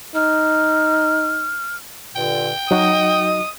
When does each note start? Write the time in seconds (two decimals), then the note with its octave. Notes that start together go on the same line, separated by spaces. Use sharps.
0.15 D#4 F6
2.15 G2 A#2 D3 G5
2.71 F#3 D#4 F#4 D#5 D#6